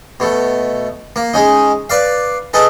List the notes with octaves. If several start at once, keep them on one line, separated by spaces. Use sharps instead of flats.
B2 A3
A#3
G#3 C#4 D#4
B4 D5 F5
D#4 G#4 A4 B4